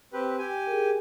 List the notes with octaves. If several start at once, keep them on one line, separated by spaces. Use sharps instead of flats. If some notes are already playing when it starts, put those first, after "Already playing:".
C4 G4 B4
G4 G#5
G#4 A#4